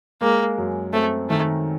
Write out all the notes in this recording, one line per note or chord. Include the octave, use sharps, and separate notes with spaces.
G#3 A#3
F#2
A3 C4
D#3 A3